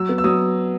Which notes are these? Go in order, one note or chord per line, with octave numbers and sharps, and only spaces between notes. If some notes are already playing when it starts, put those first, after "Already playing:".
Already playing: F#3 E6
B3
E6
F#3 D#6